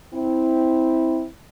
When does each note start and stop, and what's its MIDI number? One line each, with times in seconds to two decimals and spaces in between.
0.13 1.24 60
0.13 1.24 64